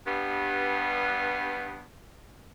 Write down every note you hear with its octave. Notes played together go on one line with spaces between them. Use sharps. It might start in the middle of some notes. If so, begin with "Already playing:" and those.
G2 B3